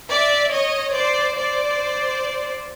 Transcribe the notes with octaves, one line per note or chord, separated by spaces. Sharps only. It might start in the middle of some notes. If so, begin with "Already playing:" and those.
D5 E5
C#5 D#5
C5 D5
C5 D5